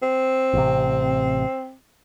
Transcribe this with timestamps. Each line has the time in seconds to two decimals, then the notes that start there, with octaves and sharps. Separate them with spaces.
0.02 C4
0.54 A1 C3